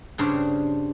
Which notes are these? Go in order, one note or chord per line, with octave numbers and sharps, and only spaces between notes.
G2 C#3 D4 C5 C#5